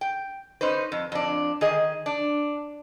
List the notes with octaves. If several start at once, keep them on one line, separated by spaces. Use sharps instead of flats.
G5
C#4 D#4 B4 C5
F2
F2 D4
D#3 G#4 D#5
D4